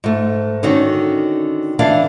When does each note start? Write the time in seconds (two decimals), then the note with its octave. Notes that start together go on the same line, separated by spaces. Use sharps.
0.04 G#2 A3
0.63 D3 D#3 C#4 D#4 F#4
1.79 D3 E3 D4 D5 F5